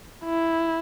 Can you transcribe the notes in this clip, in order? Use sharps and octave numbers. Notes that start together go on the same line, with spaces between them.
E4